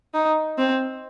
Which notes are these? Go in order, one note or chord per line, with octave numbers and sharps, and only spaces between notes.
D#4
C4